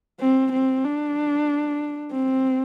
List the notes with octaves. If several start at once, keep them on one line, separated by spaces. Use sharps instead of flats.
C4
C4
D4
C4